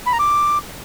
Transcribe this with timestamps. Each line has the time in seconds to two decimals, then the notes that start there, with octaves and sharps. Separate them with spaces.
0.06 B5
0.13 A#5
0.19 D6